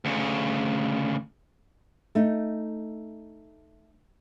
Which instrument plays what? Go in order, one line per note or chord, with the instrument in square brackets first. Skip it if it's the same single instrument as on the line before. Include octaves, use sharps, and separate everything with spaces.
[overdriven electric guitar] D2 C#3
[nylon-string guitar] A3 D#4